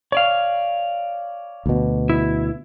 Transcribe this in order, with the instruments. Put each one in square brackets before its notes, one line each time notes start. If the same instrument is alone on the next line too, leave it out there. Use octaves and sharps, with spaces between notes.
[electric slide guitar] C#5 D5 F5
[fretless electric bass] D2 B2
[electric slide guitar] E4